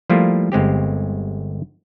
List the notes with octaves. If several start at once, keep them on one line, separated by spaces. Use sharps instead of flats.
F3 G3 A3 A#3 E4 F4
G1 G#3 C4 G4